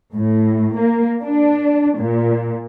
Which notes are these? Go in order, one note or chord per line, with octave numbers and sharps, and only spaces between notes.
A2
A#3
D4
A#2